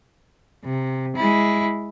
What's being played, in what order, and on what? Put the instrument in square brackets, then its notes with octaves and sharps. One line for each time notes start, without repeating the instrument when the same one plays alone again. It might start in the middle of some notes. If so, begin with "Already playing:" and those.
[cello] C3
G#3 E4